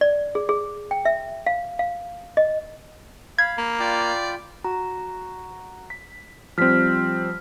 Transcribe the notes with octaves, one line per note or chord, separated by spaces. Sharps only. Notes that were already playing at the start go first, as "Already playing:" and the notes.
D5
G#4
G#4
G5
E5
F5
F5
D#5
F5 B5 G#6
A#3 B5
F4 D5 G5 B5
F#4 A#5
B6
F3 G3 C4 F6 B6